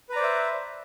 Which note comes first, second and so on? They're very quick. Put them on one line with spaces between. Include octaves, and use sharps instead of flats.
B4 A#5 D5 C5 E5